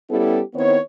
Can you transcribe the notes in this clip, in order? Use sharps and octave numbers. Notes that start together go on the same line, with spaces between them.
G3 B3 C#4 E4 G4 A4
D#3 B3 C4 E4 C#5